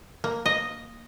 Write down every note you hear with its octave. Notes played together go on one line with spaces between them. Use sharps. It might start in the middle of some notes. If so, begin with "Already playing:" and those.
A#3
D#5